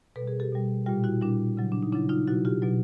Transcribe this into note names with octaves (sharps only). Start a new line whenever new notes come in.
B2 A4 B4
G3
G#4 A#4
G4 A4
B2 G3
A#2 G3 F4 G4
E4 F#4
A#2 G3 D4 E4
C#3 F#3
D4
D#4
C#3 F#3 D4 E4
D#4 F4
B2 F#3 E4 F#4
F4 G4
B2 F#3